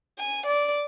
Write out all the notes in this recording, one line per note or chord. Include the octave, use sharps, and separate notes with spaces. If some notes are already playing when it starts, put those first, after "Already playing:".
G#5
D5